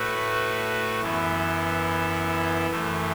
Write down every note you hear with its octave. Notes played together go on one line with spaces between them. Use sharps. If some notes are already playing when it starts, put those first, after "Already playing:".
Already playing: A2 A3 F#4 B4
F#2 E3 B3 E4
F#2 E3 A3